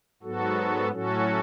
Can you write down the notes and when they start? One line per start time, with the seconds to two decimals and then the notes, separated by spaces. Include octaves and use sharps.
0.23 G#2 F#3 B3 F#4 A4
0.90 A2 F#3 C#4 F#4 A4